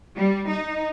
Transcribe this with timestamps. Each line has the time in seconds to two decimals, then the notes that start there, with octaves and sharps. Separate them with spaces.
0.16 G3
0.49 D#4